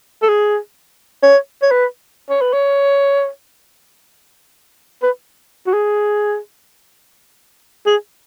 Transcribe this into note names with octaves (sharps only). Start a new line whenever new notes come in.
A4
G#4
C#5
C#5
B4
C#5
B4
C#5
B4
F#4
G#4
G#4